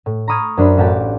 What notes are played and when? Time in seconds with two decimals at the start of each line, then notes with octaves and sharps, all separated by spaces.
0.06 A2
0.28 A#5 B5 C#6 D#6 F6 G#6
0.57 F#2 D4 C5 B5
0.77 A1 F#4 G4 A5 D6